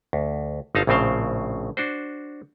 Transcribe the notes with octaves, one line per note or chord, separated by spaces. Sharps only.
D2
G1 D#4 F5 A5
A#1 A2 C#3 C4 C5 F5
D4 F#4 C5